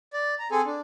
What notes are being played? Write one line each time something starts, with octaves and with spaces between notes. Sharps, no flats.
D5
A#5
C4 G#4 A4 G#5
D4